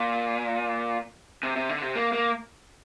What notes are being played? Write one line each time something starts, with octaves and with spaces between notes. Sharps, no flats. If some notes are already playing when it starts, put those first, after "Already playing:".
Already playing: A#2
C3
C3
D3
C3
A#3
A#3